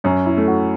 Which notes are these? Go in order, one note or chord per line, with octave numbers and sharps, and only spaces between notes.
F#2 C#4
E4
A3
F#4